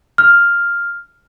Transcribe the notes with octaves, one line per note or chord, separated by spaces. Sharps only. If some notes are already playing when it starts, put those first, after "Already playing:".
F6